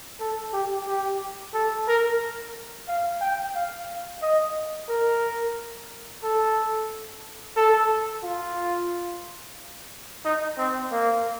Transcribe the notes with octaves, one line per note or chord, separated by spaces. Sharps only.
A4
G4
G4
A4
A#4
F5
G5
F5
D#5
A#4
A4
A4
F4
D#4
C4
A#3